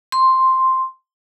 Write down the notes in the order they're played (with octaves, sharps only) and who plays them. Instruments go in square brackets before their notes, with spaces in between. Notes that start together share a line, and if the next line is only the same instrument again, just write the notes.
[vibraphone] C6